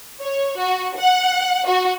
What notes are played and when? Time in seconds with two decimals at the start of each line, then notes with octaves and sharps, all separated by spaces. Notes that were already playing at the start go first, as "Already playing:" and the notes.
0.22 C#5
0.59 F#4
0.98 F#5
1.67 F#4